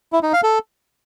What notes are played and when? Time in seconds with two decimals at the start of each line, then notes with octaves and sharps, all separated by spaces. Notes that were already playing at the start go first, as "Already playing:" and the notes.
0.13 E4
0.23 D#4
0.33 F5
0.43 A4